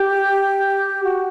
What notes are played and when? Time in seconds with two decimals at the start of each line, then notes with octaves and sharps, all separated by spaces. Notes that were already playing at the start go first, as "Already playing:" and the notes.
Already playing: G4
1.03 F#4